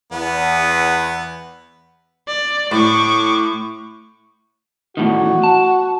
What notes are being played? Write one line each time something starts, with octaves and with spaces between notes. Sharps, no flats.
E2 B3
D5
A2 C#6 D6
E2 A2 D#3 F#4
A5